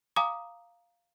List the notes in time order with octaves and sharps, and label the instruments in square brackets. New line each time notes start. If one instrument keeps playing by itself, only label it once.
[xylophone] F5 G#5 A#5 D6 D#6